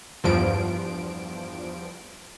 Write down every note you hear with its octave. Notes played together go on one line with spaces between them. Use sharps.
E2 G2 F3 D7